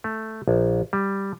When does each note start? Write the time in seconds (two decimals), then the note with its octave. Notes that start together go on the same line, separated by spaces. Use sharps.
0.04 A3
0.48 A#1
0.93 G3